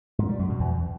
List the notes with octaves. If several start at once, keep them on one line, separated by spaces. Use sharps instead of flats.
G#2
G3
F#2
B2
E2